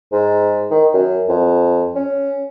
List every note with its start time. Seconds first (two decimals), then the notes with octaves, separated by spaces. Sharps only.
0.13 G#2
0.71 D#3
0.94 F#2
1.29 F2
1.95 C#4